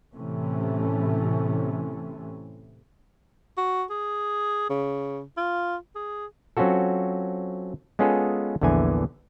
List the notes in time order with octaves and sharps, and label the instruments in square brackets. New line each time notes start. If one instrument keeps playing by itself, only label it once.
[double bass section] A2 C3 E3 A3 C#4
[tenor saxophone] F#4
G#4
C#3
F4
G#4
[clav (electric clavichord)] F#3 C4 C#4 F4 F#4 A4
G#3 B3 C#4 F4 G#4 A4
A#1 E2 D3 E3 G#5